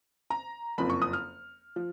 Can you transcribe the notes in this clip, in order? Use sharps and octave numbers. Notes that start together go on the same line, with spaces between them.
A#5
F#1 F2 F3 B5
C#6
D#6
F6
F3